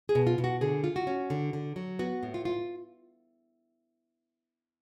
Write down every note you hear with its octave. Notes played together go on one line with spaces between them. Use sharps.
G#4
B2
F4
B2
F#4
D3 G#4
F4
F#4
C#4
D3
D3
F#3
B3 F#4
A2
F4
F4